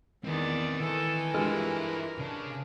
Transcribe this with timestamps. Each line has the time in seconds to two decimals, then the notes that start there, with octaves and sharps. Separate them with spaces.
0.25 E2 D#3 C4 B4 D5
0.80 D#3 E3 A4
1.34 G2 G#3 F4 A4 A#4 F6
2.18 C#3 D4